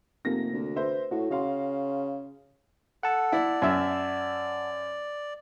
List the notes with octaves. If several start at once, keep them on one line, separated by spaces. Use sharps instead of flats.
F1 C3 A#3 A#6
D2
B4 C5 E5
A2 F#4
C#3 F#4 F5 C6
A4 F#5 A5
E4 D5
F#2 E5